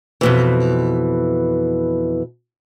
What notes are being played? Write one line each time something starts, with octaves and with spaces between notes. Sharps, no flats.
F2 B2 E3